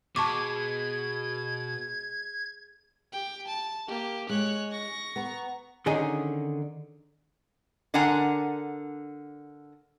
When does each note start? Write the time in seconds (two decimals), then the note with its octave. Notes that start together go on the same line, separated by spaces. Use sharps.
0.16 B2 G#3 A5 C#6 D6 G#6
3.12 G4 G5
3.47 A5
3.87 A#3 G4
4.29 G#3 C#5 F#6
4.71 C#6 A#6
5.16 B3 A#5
5.86 D3 D#3 C#4 D#4 G#4
7.94 D3 D4 A#4 F#5 G#5 A#5